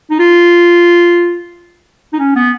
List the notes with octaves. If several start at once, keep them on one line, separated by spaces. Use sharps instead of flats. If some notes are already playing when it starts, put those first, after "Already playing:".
D#4
F4
D#4
C#4
B3